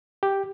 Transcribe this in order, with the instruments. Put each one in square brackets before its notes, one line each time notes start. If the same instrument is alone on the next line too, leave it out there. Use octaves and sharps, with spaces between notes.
[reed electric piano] G4